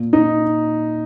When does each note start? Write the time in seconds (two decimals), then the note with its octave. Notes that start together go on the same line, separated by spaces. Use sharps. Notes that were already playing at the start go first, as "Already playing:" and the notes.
Already playing: A#2
0.13 D#4